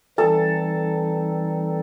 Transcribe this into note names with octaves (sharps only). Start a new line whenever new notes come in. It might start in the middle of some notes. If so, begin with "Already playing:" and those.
E3 G3 C4 D#4 A4